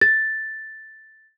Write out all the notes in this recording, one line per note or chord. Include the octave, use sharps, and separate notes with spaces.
A6